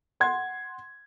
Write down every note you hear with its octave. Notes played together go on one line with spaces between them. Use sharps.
F#5 C6 G#6